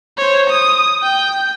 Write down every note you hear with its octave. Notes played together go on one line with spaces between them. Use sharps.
C5 C#5
D#6
G5